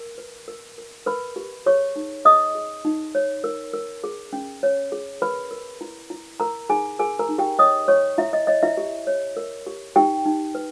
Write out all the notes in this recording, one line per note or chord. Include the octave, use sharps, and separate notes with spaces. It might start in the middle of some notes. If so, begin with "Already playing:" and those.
Already playing: A#4
B4
A#4
A#4
A#4 B4 B5
G4
G#4 C#5 C#6
D#4
G#4 D#5 D#6
G#4
D#4
C#5
A#4
A#4
G#4
C#4
C#5
G#4
A#4 B4 B5
A#4
E4
E4
A#4 A#5
D#4 G#4 G#5
G#4 A#4 G#5
A#4 A#5
D#4
G4 G5
C#5 D#5 D#6
G4 C#5 C#6
E4 C#5 E5
D#5
C#5 D#5
E4 E5
G4
C#5
A#4
G4
D#4 G4 G5
D#4
B4